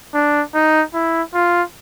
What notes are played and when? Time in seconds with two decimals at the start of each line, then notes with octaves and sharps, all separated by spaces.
0.14 D4
0.55 D#4
0.94 E4
1.34 F4